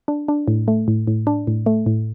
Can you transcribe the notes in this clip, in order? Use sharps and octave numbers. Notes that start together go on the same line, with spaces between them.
D4
D4
A2
A3
A2
A2
D4
A2
A3
A2